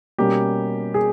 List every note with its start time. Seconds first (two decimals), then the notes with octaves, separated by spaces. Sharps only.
0.18 B2 G3 A#3 C#4 G4
0.94 G#4